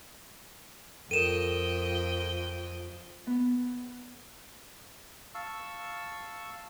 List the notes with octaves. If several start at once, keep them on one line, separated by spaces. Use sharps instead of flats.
F2 A4 A#4 D#5 G5 D#7 E7
B3
F5 A5 C#6 E6